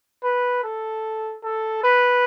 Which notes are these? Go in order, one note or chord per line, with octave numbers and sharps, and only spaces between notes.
B4
A4
A4
B4